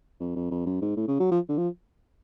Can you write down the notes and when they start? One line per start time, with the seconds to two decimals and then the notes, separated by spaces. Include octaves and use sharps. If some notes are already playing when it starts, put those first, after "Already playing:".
0.20 F2
0.36 F2
0.51 F2
0.66 F#2
0.81 G#2
0.97 A2
1.08 C#3
1.20 F#3
1.31 F3
1.49 D3
1.57 F3